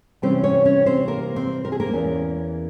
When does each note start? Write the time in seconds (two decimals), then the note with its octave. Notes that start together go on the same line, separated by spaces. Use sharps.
0.22 C3 E3 G3 C4 C#4 C5
0.44 C#4 C#5
0.65 C#4 C#5
0.86 C4 C5
1.08 A#3 A#4
1.36 C4 C5
1.65 A#4
1.72 G#4
1.80 A#3 A#4
1.93 E2 E3 A#3 C#4